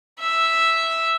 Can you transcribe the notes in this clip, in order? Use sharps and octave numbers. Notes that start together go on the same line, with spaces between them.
E5